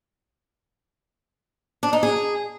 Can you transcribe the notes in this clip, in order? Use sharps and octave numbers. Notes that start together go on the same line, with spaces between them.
D4
D#4
G#4